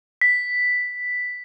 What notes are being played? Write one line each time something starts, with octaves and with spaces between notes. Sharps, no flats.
B6